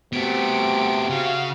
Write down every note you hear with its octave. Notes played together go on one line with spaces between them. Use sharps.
C3 A3 B3 F#4 D7
C#3 F#4 F5